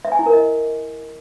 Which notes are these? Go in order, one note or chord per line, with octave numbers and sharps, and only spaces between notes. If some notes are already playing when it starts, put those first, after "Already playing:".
E5
G#5
E4
A#4
D#5